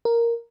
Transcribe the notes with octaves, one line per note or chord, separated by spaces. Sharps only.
A#4